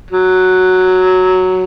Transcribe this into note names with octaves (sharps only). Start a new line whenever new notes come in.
F#3